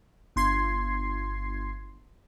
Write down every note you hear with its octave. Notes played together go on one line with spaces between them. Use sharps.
G1 C6 G#6 C7